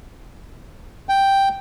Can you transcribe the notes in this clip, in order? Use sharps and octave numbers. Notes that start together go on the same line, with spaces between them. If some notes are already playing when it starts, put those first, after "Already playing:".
G5